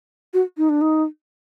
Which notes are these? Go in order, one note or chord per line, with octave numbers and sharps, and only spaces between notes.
F#4
D#4
D4
D#4